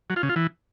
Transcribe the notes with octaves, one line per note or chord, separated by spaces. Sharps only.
F#3
F4
C#3
F4
E3